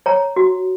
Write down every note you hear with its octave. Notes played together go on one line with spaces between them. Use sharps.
C#5 A#5
F#4